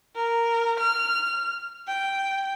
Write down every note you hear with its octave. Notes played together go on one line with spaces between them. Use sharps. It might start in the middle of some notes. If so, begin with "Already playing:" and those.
A#4
F6
G5